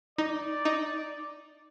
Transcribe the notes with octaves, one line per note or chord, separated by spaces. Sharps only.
D#4 D5
D#4